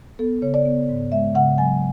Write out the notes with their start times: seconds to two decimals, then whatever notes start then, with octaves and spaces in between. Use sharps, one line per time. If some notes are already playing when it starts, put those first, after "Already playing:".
0.19 B3 A4
0.42 C#3 C#5
0.54 D5
0.65 B3
0.89 G#2
1.12 G#3 E5
1.35 C#3 F#5
1.58 F#3 G#5